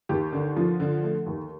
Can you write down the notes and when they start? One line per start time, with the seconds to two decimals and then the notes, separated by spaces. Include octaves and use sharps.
0.09 D#2 G4
0.33 D3
0.56 F3
0.80 D3
1.03 A3
1.26 D#2